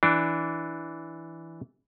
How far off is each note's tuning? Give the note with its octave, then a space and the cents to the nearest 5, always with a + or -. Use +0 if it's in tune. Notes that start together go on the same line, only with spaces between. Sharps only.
E3 +0 D4 +0